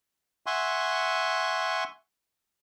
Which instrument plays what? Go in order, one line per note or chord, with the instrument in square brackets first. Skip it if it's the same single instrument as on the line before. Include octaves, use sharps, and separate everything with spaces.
[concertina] E5 F#5 G#5 C6 C#6